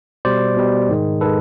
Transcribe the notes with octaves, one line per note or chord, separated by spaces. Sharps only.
B2 G3 C5 D5
B2 G3
G#2 D#3 G#3
D#3 G#3 A4 B4